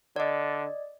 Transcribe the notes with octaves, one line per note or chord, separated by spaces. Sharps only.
D3 D5 D#5